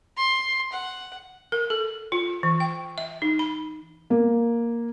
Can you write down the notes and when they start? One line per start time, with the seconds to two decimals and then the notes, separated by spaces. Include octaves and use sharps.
0.17 C6
0.73 F#5
1.52 A#4
1.70 A4
2.12 F4
2.43 E3
2.60 G5
2.98 E5
3.22 D#4
3.39 B5
4.10 A#3